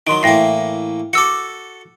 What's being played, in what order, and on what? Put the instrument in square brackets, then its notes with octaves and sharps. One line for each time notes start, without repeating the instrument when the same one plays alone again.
[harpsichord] D#3 F#3 [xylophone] C6 D7
[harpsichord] A2 E3 A#3 [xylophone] G5 A#6 C7
[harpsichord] F#4 A4 [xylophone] D6 E6 C#7